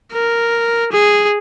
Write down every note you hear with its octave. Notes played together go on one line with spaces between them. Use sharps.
A#4
G#4